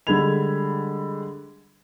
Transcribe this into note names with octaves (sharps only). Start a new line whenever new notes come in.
D3 G3 G#3 B5 G#6 F7